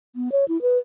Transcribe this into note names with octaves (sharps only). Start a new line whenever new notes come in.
B3
C#5
E4
B4